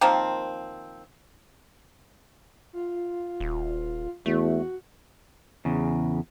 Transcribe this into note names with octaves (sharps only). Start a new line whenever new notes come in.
D#3 F3 A#3 C4
F4
D#1
E2 A3 F#4
E2 C#3